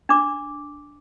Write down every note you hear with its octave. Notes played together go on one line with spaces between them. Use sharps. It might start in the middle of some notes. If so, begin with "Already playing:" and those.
D4 D6